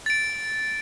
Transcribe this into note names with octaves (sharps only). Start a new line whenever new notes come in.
A6 D7